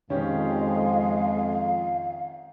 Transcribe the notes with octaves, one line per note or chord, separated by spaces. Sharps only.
F2 D#3 G#3 C#4 G4 F5